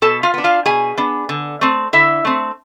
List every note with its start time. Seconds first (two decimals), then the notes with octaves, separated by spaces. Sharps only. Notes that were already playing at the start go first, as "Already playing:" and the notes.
0.02 B2 A4 A5
0.23 F4 F5
0.34 B3 D4
0.44 F4 F5
0.66 B2 G#4 G#5
0.98 B3 D4
1.29 D3
1.61 A3 C4
1.93 D3 E4 E5
2.25 A3 C4